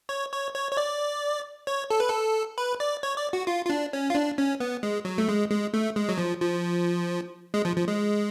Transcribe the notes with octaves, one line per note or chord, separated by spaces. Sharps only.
C#5
C#5
C#5
C#5
D5
C#5
A4
B4
A4
B4
D5
C#5
D5
F#4
F4
F4
D4
C#4
F4
D4
C#4
B3
G#3
F#3
A3
G#3
G#3
A3
G#3
F#3
F3
F3
G#3
F3
F3
G#3